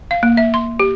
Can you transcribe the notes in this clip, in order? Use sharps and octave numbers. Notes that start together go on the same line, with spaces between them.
F5
A#3
E5
C6
G4